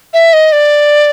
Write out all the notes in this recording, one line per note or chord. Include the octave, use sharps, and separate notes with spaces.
E5
D#5
D5